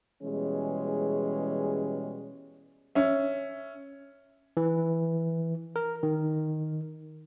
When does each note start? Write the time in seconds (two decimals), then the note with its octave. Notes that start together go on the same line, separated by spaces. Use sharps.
0.23 B2 E3 G3 G#3 C#4 G#4
2.95 C#4 E5
4.57 E3
5.76 A#4
6.03 D#3